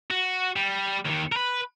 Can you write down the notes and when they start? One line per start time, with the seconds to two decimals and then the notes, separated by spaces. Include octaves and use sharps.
0.10 F#4
0.56 G3
1.05 D#2 D#3
1.32 A#4 B4